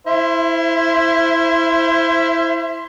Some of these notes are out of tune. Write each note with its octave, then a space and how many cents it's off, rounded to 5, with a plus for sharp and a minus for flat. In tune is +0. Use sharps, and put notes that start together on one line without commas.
E4 +0 C5 +0 E5 +35